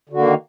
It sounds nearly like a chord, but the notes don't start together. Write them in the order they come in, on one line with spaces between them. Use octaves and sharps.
D3 F#4 A#3 D#3